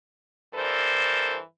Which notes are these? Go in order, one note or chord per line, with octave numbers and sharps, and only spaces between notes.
G2 E3 A4 A#4 C5 D5